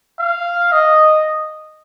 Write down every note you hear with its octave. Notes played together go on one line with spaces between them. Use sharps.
F5
D#5